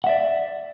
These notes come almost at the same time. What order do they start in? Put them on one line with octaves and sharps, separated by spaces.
F#5 E5 D5